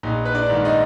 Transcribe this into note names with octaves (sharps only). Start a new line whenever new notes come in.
A#1 D#4 D#5
B4
D4 D5
G#2 D#3
D#4 D#5